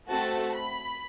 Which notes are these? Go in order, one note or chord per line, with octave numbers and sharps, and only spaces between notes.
A3 C4 F#4 A4 A5
B5